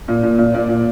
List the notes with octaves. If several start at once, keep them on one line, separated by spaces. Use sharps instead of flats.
A#2
A#2
A#2
A#2 D5
A#2